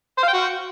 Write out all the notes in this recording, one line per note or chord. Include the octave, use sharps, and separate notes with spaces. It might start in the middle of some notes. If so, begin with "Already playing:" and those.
C5
F5
G5
F#4